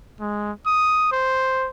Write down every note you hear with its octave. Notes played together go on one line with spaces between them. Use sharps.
G#3
D#6
C5